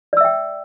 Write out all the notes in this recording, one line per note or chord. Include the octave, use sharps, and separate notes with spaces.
D5 E5 G5 E6